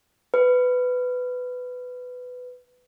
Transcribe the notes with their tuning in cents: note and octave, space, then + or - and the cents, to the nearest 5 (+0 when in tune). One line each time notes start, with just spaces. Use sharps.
B4 +15